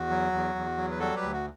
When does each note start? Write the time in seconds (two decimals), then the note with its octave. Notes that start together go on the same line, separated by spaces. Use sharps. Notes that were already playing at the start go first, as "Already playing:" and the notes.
Already playing: E2 F#4
0.10 F#3
0.32 E2
0.55 E2
0.77 F#3
0.91 B4
1.00 G3 F#4 A4
1.16 G4 B4
1.22 D2
1.33 F#4